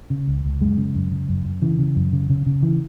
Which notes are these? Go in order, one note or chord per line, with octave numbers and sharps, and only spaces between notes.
C#3
C#2
C#2
F#2 G#3
C#3
F#2
C#3
F#2
F#2
C#3 E3
C#3
F#2
C#3
C#3
C#3
E3